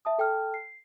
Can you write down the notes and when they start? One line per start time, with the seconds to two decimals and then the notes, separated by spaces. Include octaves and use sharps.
0.05 E5 A5 D#6
0.19 A4 G5 A5 F6
0.54 C7